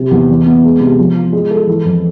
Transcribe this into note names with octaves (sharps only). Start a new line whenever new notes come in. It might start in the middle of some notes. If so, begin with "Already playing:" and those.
Already playing: C3
E2
E3
B3
G#3
C3
F3
F4
G#3
A4
E3
F2